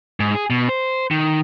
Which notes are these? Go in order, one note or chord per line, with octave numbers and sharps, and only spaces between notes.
G#2
G#4
B2
C5
D#3